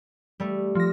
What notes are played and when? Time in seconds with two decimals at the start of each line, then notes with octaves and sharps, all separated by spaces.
0.40 G3 A3
0.75 F3 A#6